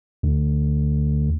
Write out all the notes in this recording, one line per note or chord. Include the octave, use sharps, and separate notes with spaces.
D2